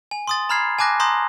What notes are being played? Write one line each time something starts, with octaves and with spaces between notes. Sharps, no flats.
G#5
C6 D#6 A6
A#5 B5 F6 G#6 C7
G#5 A5 D6 F#6 A#6
A#5 C6 D#6 G6 A#6